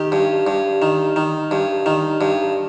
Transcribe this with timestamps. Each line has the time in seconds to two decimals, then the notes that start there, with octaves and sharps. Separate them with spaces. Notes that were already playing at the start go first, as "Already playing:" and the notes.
Already playing: D#3 G4
0.12 G2
0.47 G2
0.82 D#3
1.16 D#3
1.51 G2
1.86 D#3
2.21 G2